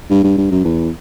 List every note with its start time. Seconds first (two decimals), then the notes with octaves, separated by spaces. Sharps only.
0.10 G2
0.23 G2
0.37 G2
0.51 F#2
0.64 E2